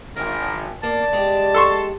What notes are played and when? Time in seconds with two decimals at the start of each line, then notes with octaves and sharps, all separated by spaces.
0.16 G#1 D#3 A#4
0.83 A#3 D5 A5
1.13 G#3 G4
1.55 A4 C6 C#6